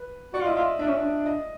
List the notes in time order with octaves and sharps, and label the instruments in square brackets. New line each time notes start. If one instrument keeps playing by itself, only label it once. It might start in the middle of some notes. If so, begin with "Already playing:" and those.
Already playing: [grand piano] B4
[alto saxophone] F#4 [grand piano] D5
[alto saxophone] F4
[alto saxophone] E4 [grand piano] D#5
[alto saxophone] F4 [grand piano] E5
[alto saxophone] D4 [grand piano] E5
[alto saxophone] C#4
D4
[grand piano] D#5